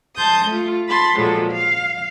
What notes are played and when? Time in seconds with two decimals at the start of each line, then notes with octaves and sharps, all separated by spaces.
0.16 A5 C6 D#6 G6
0.45 A3 F4
0.88 A5 B5 C6 A6
1.18 A#2 F3 F#3 G#3 A4
1.51 F5